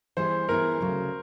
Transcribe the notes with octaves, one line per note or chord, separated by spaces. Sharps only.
E3 G3 B3 E4 G#4 C5
E3 G3 B3 E4 G#4 A#4
D2 C#3 F#3